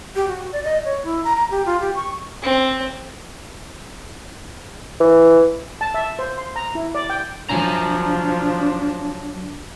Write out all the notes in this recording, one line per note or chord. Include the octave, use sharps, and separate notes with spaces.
G4
F#4
D5
D#5
C#5
E4
A#5
A#5
G4
F4
G4
C#6
C4
E3
A5
E5
C5
C6
A#5
E4
D5
G5
F3 F#3 D4 G#5 A#5